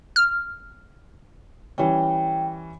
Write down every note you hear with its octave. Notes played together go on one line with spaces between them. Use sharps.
F6
E3 G3 C#4 G5